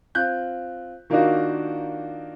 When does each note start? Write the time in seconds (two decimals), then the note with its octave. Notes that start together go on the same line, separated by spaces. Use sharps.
0.15 C4 F4 F#6 G6
1.10 D#3 A#3 D4 D#4 F4 F#4